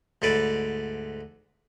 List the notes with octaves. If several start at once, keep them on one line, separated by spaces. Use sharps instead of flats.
D2 G#2 A4 B4 D5